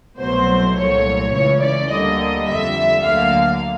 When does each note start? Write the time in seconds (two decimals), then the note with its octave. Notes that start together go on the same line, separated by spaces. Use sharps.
0.19 C2 B2 F#3 A3 C5
0.76 C2 A#2 F#3 A3 C#5
1.33 C#2 C#3 E3 C#5
1.61 D5
1.90 D2 D3 G3 A#3 D#5
2.47 F2 D3 G3 E5
3.04 D2 D3 F#3 A#3 F5